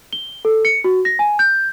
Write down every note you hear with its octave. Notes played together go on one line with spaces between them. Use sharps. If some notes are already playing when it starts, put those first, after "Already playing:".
G7
A4
C#7
F#4
A#6
G#5
G6